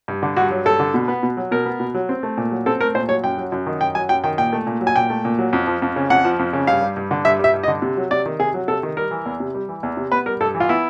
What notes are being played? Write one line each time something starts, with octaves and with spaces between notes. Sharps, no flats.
G2
D3
G2 F#4
F#3
G2 A4
D3
B2
B3
B2
F#3
B2 A#4
B3
B2
F#3
C4
A3
A#2
F#3
C4 A4
A3 A#4
A#2 C5
F#3 C#5
F#2 G5
F#3
F#2
D#3
F#2 G5
F#3 G#5
F#2 G5
D#3 G5
A#2 G5
A3
A#2
F#3
G#5
A#2 G5
A3
A#2
F#3
F2
F3
F2
C#3
F2 F#5
F3
F2
C#3
G2 F5
G3
G2
D3
G2 E5
G3 E5
G2
D#5
D3
C3
F#3
C3 D5
D#3
C3 G#4
F#3
C3 A4
D#3
G3 A#4
E3
E2
C3
G3
E3
E2
C3
B3 B4
G3 A#4
G2 A4
E3
F4
B3 E4